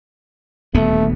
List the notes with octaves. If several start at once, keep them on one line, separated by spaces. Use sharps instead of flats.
D#1 D2 A3 B3